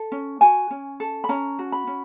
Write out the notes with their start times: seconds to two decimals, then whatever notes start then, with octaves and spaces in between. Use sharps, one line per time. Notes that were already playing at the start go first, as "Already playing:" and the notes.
Already playing: A4
0.12 C#4
0.41 F#4 G#5
0.71 C#4
1.00 A4
1.24 B5
1.29 C#4 A#5
1.59 F#4
1.72 B5
1.87 C#4